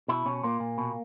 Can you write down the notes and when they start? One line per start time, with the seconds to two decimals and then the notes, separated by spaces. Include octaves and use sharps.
0.08 B2 E4
0.26 B2 C#4
0.43 A#2 A#3
0.60 A#2
0.78 B2